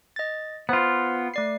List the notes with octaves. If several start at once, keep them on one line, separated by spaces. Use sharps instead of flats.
D#5 A6
B3 F4 C5
A3 D5 C7